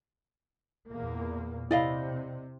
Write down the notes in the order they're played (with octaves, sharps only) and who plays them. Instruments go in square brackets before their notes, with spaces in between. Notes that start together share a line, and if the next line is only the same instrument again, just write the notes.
[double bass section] E2 A#2 A#3
[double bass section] C3 [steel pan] E4 [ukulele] D5 D#5 F5